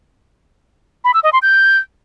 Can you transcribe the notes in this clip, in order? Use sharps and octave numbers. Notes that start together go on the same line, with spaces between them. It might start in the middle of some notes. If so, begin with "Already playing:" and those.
B5
E6
D#5
C6
G6